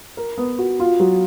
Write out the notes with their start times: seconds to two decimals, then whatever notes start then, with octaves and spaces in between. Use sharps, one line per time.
0.17 A#4
0.38 B3
0.58 F#4
0.80 F4
1.00 F#3